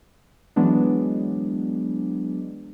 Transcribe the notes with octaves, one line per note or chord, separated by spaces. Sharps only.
E3 F#3 G#3 B3 D4